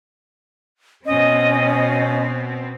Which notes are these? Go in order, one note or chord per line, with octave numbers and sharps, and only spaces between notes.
B2 C4 C#4 D#5